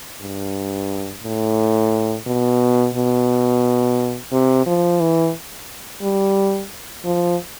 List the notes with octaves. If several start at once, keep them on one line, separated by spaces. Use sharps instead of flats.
G2
A2
B2
B2
C3
F3
E3
G3
F3